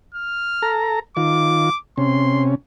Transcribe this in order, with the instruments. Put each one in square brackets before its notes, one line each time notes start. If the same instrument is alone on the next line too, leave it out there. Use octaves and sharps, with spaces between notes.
[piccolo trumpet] F6
[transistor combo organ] A4 A#5
[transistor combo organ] D#3 F4 [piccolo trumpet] D6
[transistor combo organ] C3 C#4 [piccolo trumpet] C6